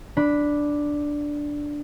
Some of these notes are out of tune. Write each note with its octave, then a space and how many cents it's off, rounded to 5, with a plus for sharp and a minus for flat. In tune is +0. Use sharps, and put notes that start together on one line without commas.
D4 +0 B5 +0